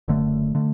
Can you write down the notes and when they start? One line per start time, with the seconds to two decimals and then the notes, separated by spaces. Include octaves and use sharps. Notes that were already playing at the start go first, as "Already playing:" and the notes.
0.08 F#1 F#2 D3 A3
0.55 D3 A3